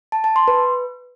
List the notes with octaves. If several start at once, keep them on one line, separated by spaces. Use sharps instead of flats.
A5
A5
C6
B4